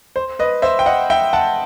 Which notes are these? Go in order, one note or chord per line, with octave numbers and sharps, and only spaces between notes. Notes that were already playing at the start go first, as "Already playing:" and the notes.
C5
B4 D#5
C5 E5
G5
D#5 F#5
E5 G5
F#5 A5